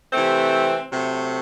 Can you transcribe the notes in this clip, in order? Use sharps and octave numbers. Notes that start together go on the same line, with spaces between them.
C3 E3 A3 C4
C3 F#3 A3